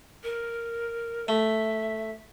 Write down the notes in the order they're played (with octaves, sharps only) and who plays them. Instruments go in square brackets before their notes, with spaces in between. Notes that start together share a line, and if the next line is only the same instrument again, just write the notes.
[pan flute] A#4
[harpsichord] A3 [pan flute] E5